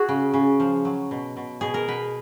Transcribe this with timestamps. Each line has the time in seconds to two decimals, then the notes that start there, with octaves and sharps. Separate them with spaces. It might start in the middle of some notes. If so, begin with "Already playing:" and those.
Already playing: F#4 G#4
0.09 C#3
0.34 C#3
0.60 F3
0.85 F#3
1.11 B2
1.37 B2
1.61 B2 G#4
1.74 A#4
1.88 B2 B4